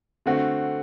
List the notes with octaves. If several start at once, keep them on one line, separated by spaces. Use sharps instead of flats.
D3 A3 C4 F#4